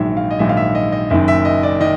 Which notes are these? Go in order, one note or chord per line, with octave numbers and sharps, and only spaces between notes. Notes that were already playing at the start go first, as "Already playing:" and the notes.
Already playing: A#1 G#2 D#3 F#3 E5
F5
D#5
A#1 G#2 D#3 F#3 E5
F5
E5
D#5
D#5
F#1 F#2 D#3 E5
E5
D#5
D5
D#3 D#5